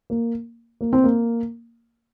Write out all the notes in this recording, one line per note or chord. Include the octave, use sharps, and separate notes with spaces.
A#3
A#3
C4
A#3